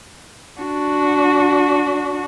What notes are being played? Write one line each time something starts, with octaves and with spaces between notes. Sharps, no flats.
D4 F#4